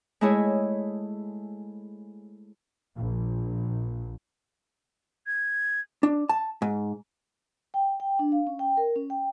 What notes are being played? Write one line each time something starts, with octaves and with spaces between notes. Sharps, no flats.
G#3 A3 E4 G#4 C#5
A#1
G#6
D4
A5
G#2
G5
G5
D4
F5
C#4
G5
A#4
C#4
G5